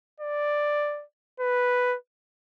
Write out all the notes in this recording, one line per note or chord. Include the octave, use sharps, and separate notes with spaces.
D5
B4